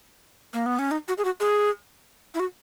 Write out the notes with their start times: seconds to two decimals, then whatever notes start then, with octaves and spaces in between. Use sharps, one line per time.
0.54 A#3
0.66 B3
0.79 C#4
0.91 D#4
1.08 F#4
1.18 G#4
1.25 F#4
1.40 G#4
2.34 E4
2.40 F#4